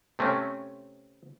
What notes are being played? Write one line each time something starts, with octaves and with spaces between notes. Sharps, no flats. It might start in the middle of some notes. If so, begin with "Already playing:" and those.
C3 A3 C4 C#4